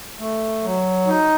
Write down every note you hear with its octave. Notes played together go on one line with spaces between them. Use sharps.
A3
F#3
D#4